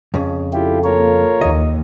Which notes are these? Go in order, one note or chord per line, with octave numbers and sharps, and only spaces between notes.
F2 C#3
E4 F4 G4 A4
A#3 F4 A#4 C#5
D#2 D#5